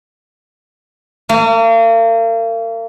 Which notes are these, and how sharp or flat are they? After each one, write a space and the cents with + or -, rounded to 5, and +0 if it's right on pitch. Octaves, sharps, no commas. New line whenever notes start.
A#3 -40